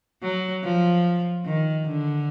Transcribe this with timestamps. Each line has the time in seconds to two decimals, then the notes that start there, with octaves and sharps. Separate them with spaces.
0.22 F#3
0.64 F3
1.45 D#3
1.86 D3